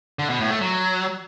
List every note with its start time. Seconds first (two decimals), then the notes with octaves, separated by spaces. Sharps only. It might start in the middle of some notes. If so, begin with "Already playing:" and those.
0.19 D3
0.29 B2
0.40 A2
0.51 A3
0.61 F#3